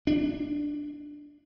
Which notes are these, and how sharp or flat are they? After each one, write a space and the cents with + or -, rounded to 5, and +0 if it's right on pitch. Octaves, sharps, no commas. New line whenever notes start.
D4 +0